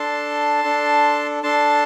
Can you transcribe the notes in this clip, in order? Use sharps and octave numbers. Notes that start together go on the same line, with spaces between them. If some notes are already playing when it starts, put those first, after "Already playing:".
Already playing: D4 A4 A5 C6
D4 A4
D4 A4 A5 C6